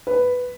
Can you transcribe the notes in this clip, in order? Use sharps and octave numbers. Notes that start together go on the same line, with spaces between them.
B4